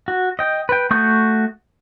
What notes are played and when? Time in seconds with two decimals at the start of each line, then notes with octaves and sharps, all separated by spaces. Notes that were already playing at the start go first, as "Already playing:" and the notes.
0.08 F#4
0.39 D#5 G5
0.69 B4 G5
0.91 A3 F#4 C#6 D#6 G6